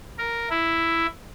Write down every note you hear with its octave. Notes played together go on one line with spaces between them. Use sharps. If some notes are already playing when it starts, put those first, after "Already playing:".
A#4
E4